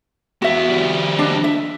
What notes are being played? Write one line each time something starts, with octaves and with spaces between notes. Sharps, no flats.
E2 B3 F#4 E5
F3 G3
D4 D#5
E5